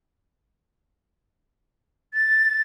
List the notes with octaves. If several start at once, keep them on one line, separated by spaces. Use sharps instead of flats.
A6